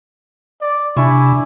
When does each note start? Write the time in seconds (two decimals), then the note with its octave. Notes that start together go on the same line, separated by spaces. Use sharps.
0.61 D5
0.97 C3 D4 E4 G#5 C#6